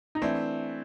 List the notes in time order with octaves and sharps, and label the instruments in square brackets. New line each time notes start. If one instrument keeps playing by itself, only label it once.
[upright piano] D#4
[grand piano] E3 A3 C4 [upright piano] D4